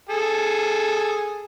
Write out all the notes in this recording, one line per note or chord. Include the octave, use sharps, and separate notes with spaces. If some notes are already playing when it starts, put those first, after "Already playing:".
G#4 A4